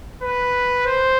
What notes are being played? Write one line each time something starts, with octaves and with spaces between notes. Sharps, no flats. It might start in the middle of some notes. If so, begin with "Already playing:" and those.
B4
C5